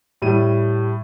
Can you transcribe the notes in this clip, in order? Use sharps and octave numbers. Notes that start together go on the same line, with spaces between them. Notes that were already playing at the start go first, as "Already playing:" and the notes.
A2 G3 D#7